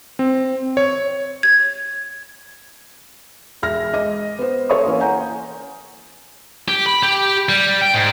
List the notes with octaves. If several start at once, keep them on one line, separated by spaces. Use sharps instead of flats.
C4
C#5
G#6
E1 E5 F6 A#6
G#3 D#5 D6 A#6
B3 C5
A4 C#5 C6 C#6 D#6
E3 A#3 C#4
F#5 G#5 A#5 G6
G4
B5
G4
G3
G5
G#2